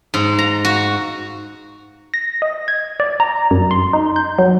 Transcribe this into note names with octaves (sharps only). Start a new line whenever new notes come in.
G#2
A#5
F#4
A#6
D#5
G#6
D5
A#5
F#2
C6
D#4
G6
F#3